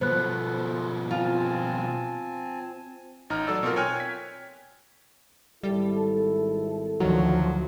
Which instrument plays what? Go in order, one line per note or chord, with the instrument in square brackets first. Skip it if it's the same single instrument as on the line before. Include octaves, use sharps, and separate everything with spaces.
[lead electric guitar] B2 F3 [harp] B3 [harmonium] A4 [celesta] C5 F#6
[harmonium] C4 G#5 A5 [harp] F4
[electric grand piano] A1 D#4 A#5 F6
F#3 A4 D5 E6
B2 C4 F4 A#4
C#5 G5 G#5 F6 F#6
G#6 B6
[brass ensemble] G#1 E4 A4 [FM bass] G3
[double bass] D2 F3 [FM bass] D#3 [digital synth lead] F#3